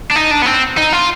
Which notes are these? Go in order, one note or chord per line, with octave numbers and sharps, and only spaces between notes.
D4
D#4
D4
B3
C4
D#4
F4